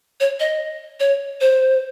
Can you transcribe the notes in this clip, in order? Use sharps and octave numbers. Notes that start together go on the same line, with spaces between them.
C#5
D#5
C#5
C5